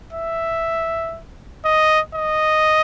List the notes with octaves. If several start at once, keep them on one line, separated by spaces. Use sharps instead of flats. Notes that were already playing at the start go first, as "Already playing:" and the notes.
E5
D#5
D#5